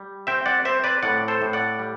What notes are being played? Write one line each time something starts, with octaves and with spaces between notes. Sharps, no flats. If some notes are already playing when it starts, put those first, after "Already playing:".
Already playing: G3
C4 E5 G5
D5 F#5
C4 C5 E5
B4 D5
A2 D5 F#5
A4 C5
A2
D5 F#5
G3